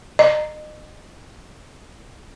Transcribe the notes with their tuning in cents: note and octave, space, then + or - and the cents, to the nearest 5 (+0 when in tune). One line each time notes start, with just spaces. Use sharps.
D#5 -30